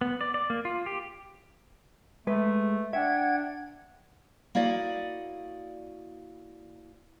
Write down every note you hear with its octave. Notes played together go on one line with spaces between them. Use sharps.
B3
D5
D5
A#3
F4
G4
G#3 A3 B4
D4 E5 F#5 G5 G#6
A#3 E4 F#4 D5 D#5